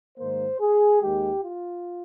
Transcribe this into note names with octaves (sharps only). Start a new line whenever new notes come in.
G#2 D#3 A#3 C5
G#4
D#2 D#3 G#3 G4
F4